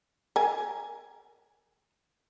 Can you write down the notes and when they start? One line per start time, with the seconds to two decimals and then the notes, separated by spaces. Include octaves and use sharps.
0.36 A#4 G#5